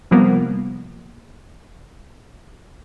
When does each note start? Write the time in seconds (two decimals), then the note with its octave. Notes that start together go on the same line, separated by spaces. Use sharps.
0.11 C3 F3 G3 A#3 B3